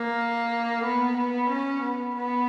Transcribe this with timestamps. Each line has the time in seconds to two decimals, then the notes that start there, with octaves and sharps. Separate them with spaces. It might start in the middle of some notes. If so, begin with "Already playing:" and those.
Already playing: A#3
0.84 B3
1.17 B3
1.50 C#4
1.83 B3
2.16 B3